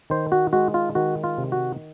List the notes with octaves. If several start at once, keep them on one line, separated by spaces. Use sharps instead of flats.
D#3 C5
F#4
G#3 F#4
F4
D#3 F#4
F4
C3
F#4